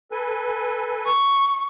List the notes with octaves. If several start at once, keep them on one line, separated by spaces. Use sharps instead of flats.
A4 B4 G#5
C#6